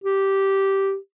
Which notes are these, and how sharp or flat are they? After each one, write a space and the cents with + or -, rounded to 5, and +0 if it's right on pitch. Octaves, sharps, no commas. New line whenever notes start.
G4 -10